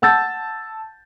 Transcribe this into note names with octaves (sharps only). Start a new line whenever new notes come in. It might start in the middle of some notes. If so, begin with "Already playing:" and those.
F#5 A5 E6 G6 A6